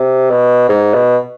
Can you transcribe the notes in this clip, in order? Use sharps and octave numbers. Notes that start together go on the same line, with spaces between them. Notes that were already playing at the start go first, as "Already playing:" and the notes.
Already playing: C3
B2
G#2
B2